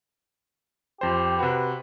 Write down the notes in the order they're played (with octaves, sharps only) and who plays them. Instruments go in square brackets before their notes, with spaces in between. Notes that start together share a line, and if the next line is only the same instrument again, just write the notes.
[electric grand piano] F2 C5 [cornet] G4
[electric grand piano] C3 F#4 [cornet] B4